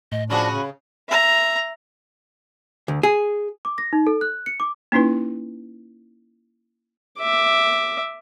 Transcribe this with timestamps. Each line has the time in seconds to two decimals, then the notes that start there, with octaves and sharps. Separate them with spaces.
0.12 A2 D#5
0.30 F3 C#4 D4 F#4 G#4 B5
0.51 C#3
1.08 E5 A#5
2.88 D2
3.03 G#4
3.65 D6
3.78 A#6
3.93 D#4
4.07 A4
4.21 F#6
4.46 C#7
4.60 D6
4.92 A#3 C#4 D#4 E4 B4
7.19 E5 D6